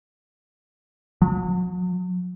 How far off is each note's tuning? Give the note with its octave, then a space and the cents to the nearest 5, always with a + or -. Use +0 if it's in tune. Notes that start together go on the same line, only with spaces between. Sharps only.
F#3 -35